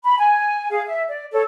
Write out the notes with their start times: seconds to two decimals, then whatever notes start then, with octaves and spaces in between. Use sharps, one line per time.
0.04 B5
0.18 G#5
0.71 G#4 F5
0.87 E5
1.08 D5
1.33 A4 C#5